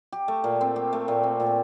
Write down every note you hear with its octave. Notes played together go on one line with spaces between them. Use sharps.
G4
A3
A#2
C4
G4
A3
A#2
C4
A#2